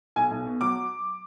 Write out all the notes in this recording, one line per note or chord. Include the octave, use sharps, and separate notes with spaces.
B1 G#5
B1
B2
F#3 D6